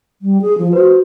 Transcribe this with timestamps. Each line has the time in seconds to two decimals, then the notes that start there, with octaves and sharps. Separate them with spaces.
0.22 G3
0.42 G#4
0.58 F3
0.73 F#4 B4 C5